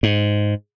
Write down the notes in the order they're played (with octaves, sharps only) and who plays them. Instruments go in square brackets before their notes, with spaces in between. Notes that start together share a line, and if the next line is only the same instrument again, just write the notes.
[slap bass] G#2